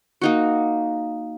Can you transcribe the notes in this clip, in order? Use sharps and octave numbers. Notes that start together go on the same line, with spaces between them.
A#3 D#4 F#4